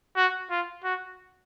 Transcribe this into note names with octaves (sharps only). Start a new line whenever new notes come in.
F#4
F4
F#4